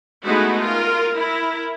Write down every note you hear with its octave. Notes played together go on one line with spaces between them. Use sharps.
G#3 A3 B3 D#4 E4 F#4
F4 A#4
E4 A#4